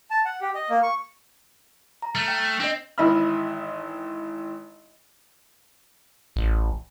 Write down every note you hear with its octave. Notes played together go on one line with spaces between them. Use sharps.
A5
F#5
G4
D#5
A#3
C#6
A#5
A3 F6
G5
C4 D4 D#5
G#1 E3 D#5 E5 B5 F6
A1